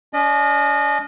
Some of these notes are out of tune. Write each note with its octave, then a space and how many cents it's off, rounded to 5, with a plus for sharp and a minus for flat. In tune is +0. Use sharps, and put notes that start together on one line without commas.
C#4 +45 D#5 -30